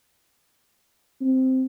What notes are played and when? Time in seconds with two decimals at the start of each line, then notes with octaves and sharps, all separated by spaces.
1.21 C4